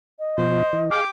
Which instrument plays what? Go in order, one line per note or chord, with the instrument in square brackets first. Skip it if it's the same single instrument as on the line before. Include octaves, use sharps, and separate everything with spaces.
[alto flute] D#5
[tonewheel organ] B2 F3 [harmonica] C5
[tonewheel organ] E3
[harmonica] G4 D6 [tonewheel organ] G#4 F5